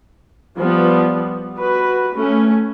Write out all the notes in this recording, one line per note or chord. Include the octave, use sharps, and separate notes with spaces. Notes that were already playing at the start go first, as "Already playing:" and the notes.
F3 G3 B3
F#4 B4
A3 C#4